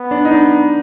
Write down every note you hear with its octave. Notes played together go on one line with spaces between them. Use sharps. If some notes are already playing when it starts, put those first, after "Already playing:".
Already playing: B3
D4
D#4
D4